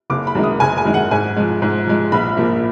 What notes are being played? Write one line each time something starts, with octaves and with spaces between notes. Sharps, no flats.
F#1 D6
B5
F#2 D#3 G#3
D#6
F#1 G#5
G#5
F#2 D#3 G#3
F#5
G#2 G#5
F3 G#3
G#2
F3 G#3
A#1 B5
A#2 F3 A#3